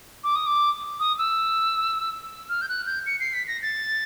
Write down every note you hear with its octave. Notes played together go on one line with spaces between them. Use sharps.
D6
D#6
D6
D#6
E6
F6
G6
F#6
G6
C#7
C7
B6
A#6
A6